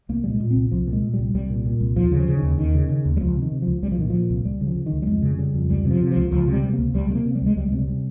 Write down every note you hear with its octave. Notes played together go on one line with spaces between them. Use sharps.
C2 A#3
A#2 G3
G#3
A#2
C4
C2
C2 F3
A#2
G#3
A#2
C2 G3
C2 G3
A#2
A#2
C2
D#2 F3
C#3
F3
C#3
D#3
D#2
D#2 D#3
C#3
C#3
D#2
G3
C#2 F3
C3
D#3
C3
C#2 F3
C2 G3
F3
A#2 D#3
A#2 F3
C2
C#2 G3
C#3
F3
C#3
D#3
C#2
G3
F2 G#3
C#3
C#3 G3
F2
C#2 G3
C3
F3
C3
F3
C#2
C#2 F3
C3
G3
C3
C#2 A#3
C#2 G3
C3 G#3
A#3
C3
G3
C#2 G#3
C#2 G3
C3 G#3
G3
C3